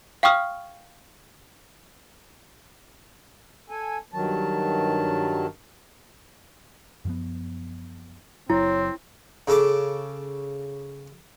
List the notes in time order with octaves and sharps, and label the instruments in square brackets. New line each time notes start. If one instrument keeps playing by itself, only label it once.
[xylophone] F5 G5 C#6 D#6 F6
[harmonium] A4 G#5
G2 D#3 F#3 A5
[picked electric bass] F#2 F3 B3
[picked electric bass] F#1 F#3 [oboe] C4 [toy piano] E4 [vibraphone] C#5
[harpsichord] C#3 A4 D6